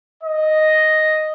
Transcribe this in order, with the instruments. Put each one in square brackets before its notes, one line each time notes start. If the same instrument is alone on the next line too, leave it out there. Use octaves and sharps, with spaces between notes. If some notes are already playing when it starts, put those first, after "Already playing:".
[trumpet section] D#5